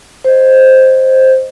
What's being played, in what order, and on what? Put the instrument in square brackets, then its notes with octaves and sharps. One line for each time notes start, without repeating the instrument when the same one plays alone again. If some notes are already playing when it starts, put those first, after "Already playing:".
[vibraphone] C5 D#5